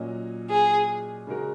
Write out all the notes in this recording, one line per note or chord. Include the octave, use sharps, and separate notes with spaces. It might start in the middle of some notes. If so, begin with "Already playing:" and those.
Already playing: A#2 F#3 C#4 F#4 D#5
G#4
C#3 G#3 D#4 F#4 A#4